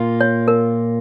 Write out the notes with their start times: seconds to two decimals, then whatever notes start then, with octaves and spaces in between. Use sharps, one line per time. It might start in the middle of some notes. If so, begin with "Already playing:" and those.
Already playing: A#2 A#3 F4
0.21 C#5
0.48 A#4